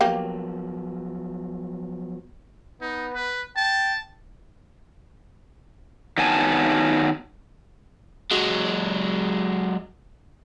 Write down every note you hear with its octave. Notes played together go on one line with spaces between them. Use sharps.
F3 F#3 A#3 B3 G4
B3 D#4
B4
G5 A5
D#3 F#3 B3 G#5 A5
F#3 G#3